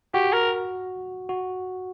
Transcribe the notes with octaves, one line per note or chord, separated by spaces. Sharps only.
F#4 G4
A#4
F#4